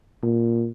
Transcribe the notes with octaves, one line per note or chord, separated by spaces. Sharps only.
A#2